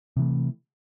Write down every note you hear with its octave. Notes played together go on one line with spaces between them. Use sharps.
C3 E3 A3